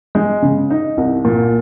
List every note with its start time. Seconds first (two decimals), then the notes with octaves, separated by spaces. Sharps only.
0.15 G#3
0.42 C#3
0.70 D#4
0.97 C2
1.25 A#2